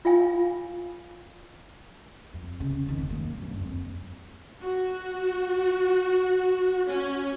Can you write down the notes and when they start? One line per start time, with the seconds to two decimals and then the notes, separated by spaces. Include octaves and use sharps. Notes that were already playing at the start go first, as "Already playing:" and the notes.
0.05 F4 F5 G#5
2.34 F2
2.60 C#3
2.86 F1 D#3
3.10 F#3 A#3
3.38 F#1 G2
3.60 F2
4.62 F#4
6.87 C#4